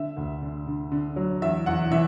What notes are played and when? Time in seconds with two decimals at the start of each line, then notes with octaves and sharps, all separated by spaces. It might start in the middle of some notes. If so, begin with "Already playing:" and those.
Already playing: D3 E5
0.17 D2
0.42 D3
0.67 D3
0.92 D3
1.16 F#3
1.42 E2 E5
1.66 E2 F#5
1.91 E3 E5